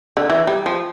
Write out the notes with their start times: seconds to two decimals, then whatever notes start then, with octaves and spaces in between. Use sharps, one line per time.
0.17 D3
0.30 E3
0.47 G3
0.66 F3